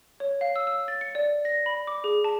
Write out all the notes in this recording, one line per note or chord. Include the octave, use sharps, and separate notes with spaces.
C#5
F5
E6
E6
A6
C#7
D5
A#6
B5
D6
G#4
A5